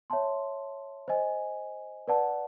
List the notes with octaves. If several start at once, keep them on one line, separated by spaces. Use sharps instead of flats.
C#5 E5 A5 C6
C5 D#5 G#5
B4 D5 F#5 A5